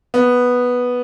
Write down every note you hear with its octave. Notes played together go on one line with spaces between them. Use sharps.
B3